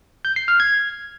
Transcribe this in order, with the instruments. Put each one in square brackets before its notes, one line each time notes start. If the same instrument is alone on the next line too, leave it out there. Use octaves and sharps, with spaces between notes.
[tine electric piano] G6
C7
F6
G#6